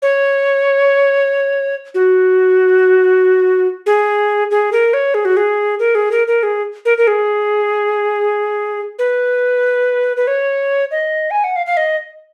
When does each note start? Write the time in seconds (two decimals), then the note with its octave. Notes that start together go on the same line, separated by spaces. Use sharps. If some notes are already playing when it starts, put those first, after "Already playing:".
0.02 C#5
1.94 F#4
3.86 G#4
4.51 G#4
4.72 A#4
4.94 C#5
5.14 G#4
5.25 F#4
5.37 G#4
5.80 A#4
5.95 G#4
6.12 A#4
6.27 A#4
6.43 G#4
6.85 A#4
6.98 A#4
7.07 G#4
8.99 B4
10.17 B4
10.27 C#5
10.91 D#5
11.31 G#5
11.44 F#5
11.56 F5
11.66 F5
11.77 D#5